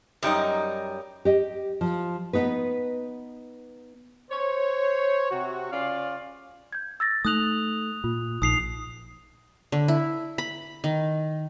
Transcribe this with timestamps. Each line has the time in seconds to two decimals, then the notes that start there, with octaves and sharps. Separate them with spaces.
0.23 F#2 G3 D#4 D#5
1.25 G4 D#5
1.81 F3
2.33 B3 D#4 B4
4.30 C5 C#5
5.31 C3 F#4
5.72 C#3 C#4 F4 D5 F5
6.72 G6 G#6
7.00 E6 A6 A#6
7.25 A3 D#4 D#6 F#6 F7 F#7
8.04 A#2 F4
8.42 A#1 D#4 D#6 C7 F7
9.72 D3
9.88 E4
10.38 B5
10.84 D#3